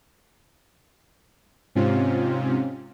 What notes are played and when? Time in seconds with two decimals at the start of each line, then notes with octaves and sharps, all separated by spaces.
1.75 G#2 C3 C4 C#4 F4